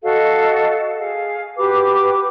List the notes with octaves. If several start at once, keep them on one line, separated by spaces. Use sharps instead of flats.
F#4 A4 D#5 F5
G#4 F5
F#4 G4 B4 D6